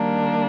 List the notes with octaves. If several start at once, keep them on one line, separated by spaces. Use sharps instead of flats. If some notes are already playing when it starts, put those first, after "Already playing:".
Already playing: D#3 G3 A#3 D4